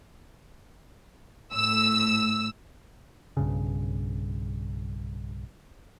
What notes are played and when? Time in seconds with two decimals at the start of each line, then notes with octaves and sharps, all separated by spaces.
1.53 A2 E6
3.37 B1 G2 C#3